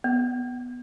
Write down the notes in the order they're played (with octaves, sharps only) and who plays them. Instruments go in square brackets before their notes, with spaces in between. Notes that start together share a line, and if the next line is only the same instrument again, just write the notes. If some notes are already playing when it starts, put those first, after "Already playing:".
[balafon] B3